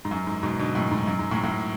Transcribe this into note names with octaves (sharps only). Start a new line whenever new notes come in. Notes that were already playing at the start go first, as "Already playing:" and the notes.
G#2
F#2
G#2
G#2 B2
B2 D3
F#2 A2
G#2
F#2
G#2
F#2 A2
F#2 A2